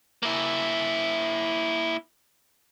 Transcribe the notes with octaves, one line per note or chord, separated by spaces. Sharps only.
A#3 E4